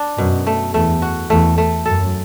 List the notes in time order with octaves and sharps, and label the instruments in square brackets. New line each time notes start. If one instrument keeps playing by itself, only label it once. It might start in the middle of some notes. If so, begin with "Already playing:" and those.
Already playing: [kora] D4
[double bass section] F#2 [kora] B2
[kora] A3
[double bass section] E2 [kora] A3
[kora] F#4
[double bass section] E2 [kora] A3
[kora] A3
[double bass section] F#2 [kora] A4